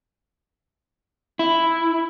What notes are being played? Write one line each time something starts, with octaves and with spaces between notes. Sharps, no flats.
E4